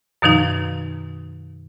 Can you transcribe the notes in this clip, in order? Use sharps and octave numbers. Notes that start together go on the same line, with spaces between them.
F#2 B2 D#3 F3 D#4